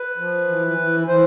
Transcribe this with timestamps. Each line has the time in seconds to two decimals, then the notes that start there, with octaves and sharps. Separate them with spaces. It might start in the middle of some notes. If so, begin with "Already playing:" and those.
Already playing: B4
0.18 F3
0.47 E3
0.78 E3
1.07 E3 C5